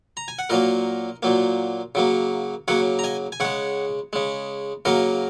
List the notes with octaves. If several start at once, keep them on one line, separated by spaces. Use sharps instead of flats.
A#5
G#5
F#5
A#2 F#3 A#3 A#4 D#5
A#2 F#3 A#3
C#3 F#3 A#3
C#3 F#3 A#3 C#5 F#5
A#5
D#5 G#5
G#5
C#3 G#3 C#5 F#5
C#3 G#3
C#3 F#3 A#3 A#4 D#5